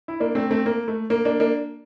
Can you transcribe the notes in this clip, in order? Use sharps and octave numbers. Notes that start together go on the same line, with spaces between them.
E4
A#3 D4
A3 C4
A3 C4
A#3
A3
A#3
A#3 D4
A#3 D4